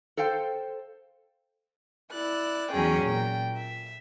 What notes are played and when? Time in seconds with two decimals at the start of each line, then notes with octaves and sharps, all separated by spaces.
0.17 A4 C5 F5 G5
2.12 E4 D5 F#6
2.72 E2 F#3 C#4 G#4 G5
3.05 A#2 G5
3.57 E5